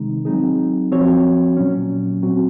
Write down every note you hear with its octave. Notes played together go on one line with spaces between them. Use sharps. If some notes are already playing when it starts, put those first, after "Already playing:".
Already playing: C3 D#3 G#3 D#4
F#3 C4 D#4 G#4
F3 C4 F#4 C#5
A#2 F#3 C#4
F#3 C4 F#4